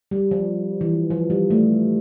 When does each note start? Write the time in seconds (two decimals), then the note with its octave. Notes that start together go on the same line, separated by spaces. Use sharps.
0.11 G3
0.31 F3
0.81 E3
1.10 F3
1.30 G3
1.50 A3